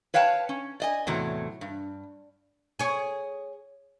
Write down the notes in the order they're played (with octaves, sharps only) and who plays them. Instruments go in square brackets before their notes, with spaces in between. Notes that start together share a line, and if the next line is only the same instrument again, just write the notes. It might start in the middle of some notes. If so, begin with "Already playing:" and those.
[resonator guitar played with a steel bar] B4 C#5 F5 G5 A5
C#4
D5 D#5 G#5
E2 A2 C3 F#3
G2
[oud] G#4 C#5